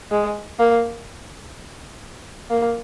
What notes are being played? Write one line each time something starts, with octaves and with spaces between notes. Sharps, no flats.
G#3
A#3
A#3